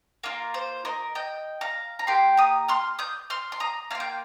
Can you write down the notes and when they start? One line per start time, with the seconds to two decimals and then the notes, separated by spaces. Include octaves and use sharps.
0.23 A#3 F4 A#4
0.54 C5
0.85 A#4 D#5
1.15 D#5 G5
1.61 F5 A#5
1.99 A#5
2.07 A#3 G4 G5 C6
2.37 A#5 D#6
2.68 C6 F6
2.99 D#6 G6
3.30 C6 F6
3.52 C6
3.60 A#5 D#6
3.91 A#3 F4 F5
4.00 G5